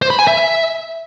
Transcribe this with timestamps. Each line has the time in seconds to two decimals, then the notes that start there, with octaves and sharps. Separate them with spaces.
0.02 C5
0.10 B5
0.19 G#5
0.27 E5